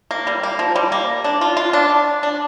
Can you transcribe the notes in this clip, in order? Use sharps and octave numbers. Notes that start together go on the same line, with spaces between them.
A#3
G3
A#3
F3
G3
A#3
D4
F4
F4
D4
D4